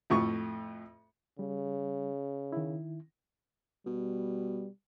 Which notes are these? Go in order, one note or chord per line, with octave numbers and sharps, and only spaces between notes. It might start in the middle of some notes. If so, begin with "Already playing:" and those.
F2 A2 C#6
C#3 G3
D#3 E4
B2 G3